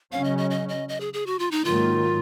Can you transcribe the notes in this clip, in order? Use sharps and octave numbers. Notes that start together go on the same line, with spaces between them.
C#3 F#3 C#4 F5
D#5
D#5
D#5
D#5
D#5
G#4
G#4
F#4
F4
D#4
G#2 D#3 F#3 A#3 F4